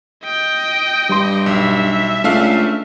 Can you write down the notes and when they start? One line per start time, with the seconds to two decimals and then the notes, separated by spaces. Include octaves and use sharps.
0.24 D#5 G5
1.09 G2 G3 C6
1.46 B1 E5
2.24 C#2 A3 D4 F5